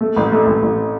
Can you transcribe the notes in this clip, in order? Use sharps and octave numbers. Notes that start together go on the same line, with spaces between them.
A3
A1
A3
A1
A1